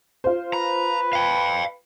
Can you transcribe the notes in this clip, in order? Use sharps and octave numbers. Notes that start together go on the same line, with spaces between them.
F4 C5
B4 A#5
F5 G5